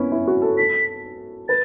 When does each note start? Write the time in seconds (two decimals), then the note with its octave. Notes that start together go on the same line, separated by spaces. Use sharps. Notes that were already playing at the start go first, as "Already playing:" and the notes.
Already playing: B3 C#4 E4
0.12 E4
0.27 F#4
0.42 A4
0.57 A4 B6
1.49 B4 A6